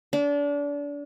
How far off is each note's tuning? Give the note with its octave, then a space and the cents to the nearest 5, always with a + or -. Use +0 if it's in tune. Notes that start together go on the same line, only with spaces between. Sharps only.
D4 -30